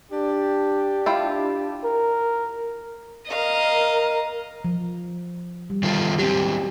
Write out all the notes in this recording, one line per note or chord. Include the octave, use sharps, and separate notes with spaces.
D4 G4
E4 F4 G5
A#4
A#4 D#5 F5
F3
G3
D#3 F4 A4
F#3 C4 G4